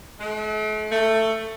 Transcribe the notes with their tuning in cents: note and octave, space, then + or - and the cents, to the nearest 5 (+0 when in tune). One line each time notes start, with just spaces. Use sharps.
A3 -45
A3 +15